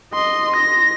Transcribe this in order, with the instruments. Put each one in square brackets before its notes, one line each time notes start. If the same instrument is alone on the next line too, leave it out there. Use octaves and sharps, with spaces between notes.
[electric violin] D#5 C6
A#6